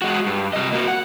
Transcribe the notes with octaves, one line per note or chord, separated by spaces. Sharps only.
G#3 F#4
G2
C3 D#5
A#3 F#4
F#5